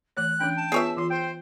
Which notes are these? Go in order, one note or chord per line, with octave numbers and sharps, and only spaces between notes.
E3 A3 C#5 F#6
E3 C#4 D4 G5
A5
B3 F4 G#4 B4 C#5 E5
E3 F4 C6
C5 G5